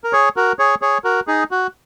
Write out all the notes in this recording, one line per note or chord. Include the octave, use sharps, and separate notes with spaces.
A#4
G#4 C#5
F#4 A#4
G#4 C#5
G#4 C#5
F#4 A#4
D#4 G#4
F#4